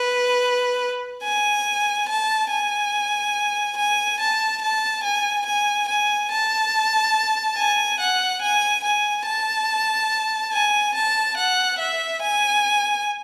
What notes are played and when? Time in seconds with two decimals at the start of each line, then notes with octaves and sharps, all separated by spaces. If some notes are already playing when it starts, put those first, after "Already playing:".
Already playing: B4
1.24 G#5
2.09 A5
2.50 G#5
3.77 G#5
4.20 A5
4.62 A5
5.04 G#5
5.46 G#5
5.89 G#5
6.31 A5
7.57 G#5
8.00 F#5
8.42 G#5
8.84 G#5
9.26 A5
10.53 G#5
10.95 A5
11.37 F#5
11.79 E5
12.22 G#5